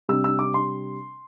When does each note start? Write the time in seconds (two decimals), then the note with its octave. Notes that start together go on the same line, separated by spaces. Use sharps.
0.08 C3 G3 D4 E6
0.24 E6
0.39 D6
0.54 C6